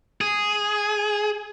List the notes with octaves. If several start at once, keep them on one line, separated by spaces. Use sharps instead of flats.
G#4